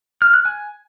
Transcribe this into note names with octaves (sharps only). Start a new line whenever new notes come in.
F6
F#6
G#5